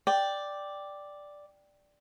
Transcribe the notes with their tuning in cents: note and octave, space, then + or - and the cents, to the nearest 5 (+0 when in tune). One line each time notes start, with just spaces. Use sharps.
D5 +0 G5 +0